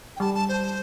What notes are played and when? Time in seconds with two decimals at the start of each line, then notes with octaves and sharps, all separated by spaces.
0.16 G5
0.20 G3 A5
0.34 A5
0.49 C5